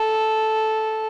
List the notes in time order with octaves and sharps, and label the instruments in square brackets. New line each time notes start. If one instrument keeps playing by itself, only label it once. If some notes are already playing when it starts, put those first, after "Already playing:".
Already playing: [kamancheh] A4